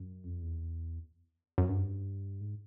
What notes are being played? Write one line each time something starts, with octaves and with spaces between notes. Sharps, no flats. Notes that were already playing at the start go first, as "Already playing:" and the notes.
Already playing: F#2
F2
E2
F#2
G2
G#2